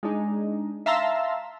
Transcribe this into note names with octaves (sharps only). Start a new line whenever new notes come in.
G#3 D4 D#4
E5 F5 A5 A#5 C6 E6